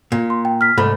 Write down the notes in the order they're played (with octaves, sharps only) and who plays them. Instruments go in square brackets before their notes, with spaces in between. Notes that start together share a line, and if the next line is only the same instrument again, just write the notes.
[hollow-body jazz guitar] A#2
[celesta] C6
G5
F6 B6
[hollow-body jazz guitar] C2 G#2 A3 [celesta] B5